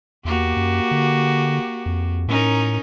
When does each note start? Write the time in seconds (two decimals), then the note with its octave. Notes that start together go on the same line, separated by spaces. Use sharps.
0.25 E2 A#3 F#4 G4
0.56 F#2
0.91 D3
1.86 F2
2.28 A2 C#4 D#4 A#4